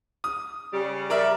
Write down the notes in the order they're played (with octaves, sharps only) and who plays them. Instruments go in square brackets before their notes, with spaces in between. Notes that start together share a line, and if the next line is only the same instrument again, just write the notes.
[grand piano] D#6
[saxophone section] C#3 G3
[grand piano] A#4 D5 E5